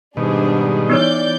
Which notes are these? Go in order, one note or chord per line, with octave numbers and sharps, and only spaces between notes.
G#2 B2 D#3 G3 D4 G#4
E3 B3 D#4 C#5 D5 G6